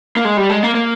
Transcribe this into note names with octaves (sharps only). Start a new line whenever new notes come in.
A#3
G#3
G3
G#3
A#3
A#3